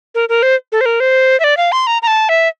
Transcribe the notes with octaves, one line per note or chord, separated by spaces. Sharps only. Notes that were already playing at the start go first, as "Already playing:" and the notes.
A#4
A#4
C5
A4
C5
A#4
C5
E5
D5
F5
C6
A#5
A#5
A5
E5